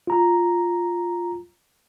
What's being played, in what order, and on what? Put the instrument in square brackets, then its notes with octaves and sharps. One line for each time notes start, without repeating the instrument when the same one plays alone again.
[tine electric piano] F4 A#5